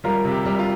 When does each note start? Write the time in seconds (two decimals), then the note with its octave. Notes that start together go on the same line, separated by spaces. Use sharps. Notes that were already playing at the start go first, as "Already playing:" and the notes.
0.04 G3 F4 A#4
0.25 C3
0.31 G4
0.45 G3
0.59 F4